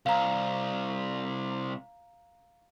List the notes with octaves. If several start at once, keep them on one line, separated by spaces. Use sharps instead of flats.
C2 F5 A#5